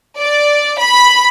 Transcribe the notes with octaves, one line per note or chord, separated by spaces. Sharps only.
D5
B5